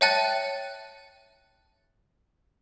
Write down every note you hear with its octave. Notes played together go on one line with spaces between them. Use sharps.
C#5 E5 G5 A5 F#6 A6